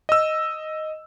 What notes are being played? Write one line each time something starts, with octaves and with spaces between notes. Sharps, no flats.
D#5 E6